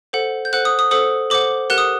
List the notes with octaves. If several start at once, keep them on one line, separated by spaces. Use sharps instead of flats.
A4 C5 F#5
G6
A4 C5 F#5 F#6
D#6
D#6
A4 C5 F#5 D#6
A4 C5 F#5 D6
G4 A#4 F#5 F#6
D#6